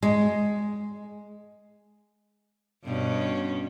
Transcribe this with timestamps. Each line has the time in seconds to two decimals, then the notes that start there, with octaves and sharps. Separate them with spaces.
0.03 G#3
2.84 G2 B2 C#4